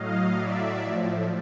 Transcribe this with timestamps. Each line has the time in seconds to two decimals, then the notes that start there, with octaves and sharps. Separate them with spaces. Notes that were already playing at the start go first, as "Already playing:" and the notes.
Already playing: A2 F#3 D#5 F5
0.35 A2 F#3 D5 E5
0.80 A2 F3